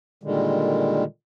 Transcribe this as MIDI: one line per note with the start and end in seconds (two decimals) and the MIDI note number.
0.23 1.04 46
0.23 1.04 50
0.23 1.04 51
0.23 1.04 55
0.23 1.04 56